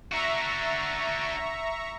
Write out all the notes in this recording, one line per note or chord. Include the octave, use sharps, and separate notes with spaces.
D4 F#4 E5 A#5 C#6